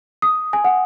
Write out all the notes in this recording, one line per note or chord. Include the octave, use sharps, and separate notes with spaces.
D#6
G#5
F#5